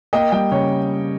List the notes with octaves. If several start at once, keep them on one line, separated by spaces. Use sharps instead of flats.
A#3 D#5 G5
G3 D#5 G5
C#3 C#5